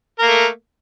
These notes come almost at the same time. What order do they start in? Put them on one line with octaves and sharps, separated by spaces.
A#4 A#3 A3